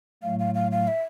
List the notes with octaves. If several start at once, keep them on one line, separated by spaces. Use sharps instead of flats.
A2 F#3 A3 F5
F5
F5
F5
E5